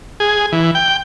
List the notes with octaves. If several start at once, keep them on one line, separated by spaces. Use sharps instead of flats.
G#4
E3
G5